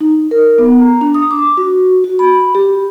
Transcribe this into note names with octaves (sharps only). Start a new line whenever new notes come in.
D#4
A#4
B3
A#5
D4
D#6
D6
F#4
F#4
B5
G4